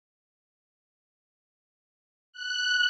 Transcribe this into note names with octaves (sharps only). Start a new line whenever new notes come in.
F#6